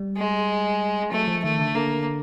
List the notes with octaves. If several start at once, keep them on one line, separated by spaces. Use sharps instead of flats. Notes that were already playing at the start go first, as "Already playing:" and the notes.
Already playing: G3
G#3
F#3 A3
F3
D#3 A3
D3
D3 A#3